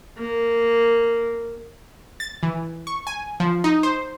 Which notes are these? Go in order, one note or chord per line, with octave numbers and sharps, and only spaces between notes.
A#3
A6
E3
C#6
G#5
F3
D#4
C5